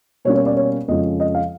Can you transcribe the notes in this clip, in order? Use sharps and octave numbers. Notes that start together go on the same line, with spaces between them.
B2 G3 A#3 C#4 C#5
C#5
D5
C#5
F2 C#3 F3 G#3 C#4 D#5
D#5
F5